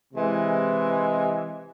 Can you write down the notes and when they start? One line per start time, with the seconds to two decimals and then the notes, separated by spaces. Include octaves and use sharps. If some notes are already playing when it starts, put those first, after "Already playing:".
0.14 C3 E3 G#3